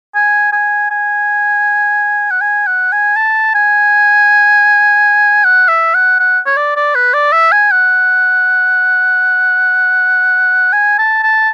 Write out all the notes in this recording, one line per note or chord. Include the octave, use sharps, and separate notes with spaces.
G#5
G#5
G#5
F#5
G#5
F#5
G#5
A5
G#5
F#5
E5
F#5
F#5
C#5
D5
D5
B4
D5
E5
G#5
F#5
G#5
A5
A5